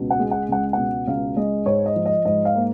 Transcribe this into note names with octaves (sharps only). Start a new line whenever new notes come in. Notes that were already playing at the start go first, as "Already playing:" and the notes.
Already playing: C#2 B2
F#5
G#3
F#5
C#2 F#5
B2 F#5
C#2 F5
G#3 D#5
G#2 C#5
D#5
F3
D#5
G#2 D#5
F5
A#3